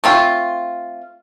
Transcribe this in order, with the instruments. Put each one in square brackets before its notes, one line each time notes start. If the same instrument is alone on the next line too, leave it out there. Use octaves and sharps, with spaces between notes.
[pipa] A3 C4 F4